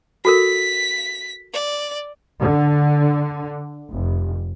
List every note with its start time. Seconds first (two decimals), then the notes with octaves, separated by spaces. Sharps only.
0.25 F#4 A4 A#4 B6
1.53 D5
2.40 D3
3.90 F1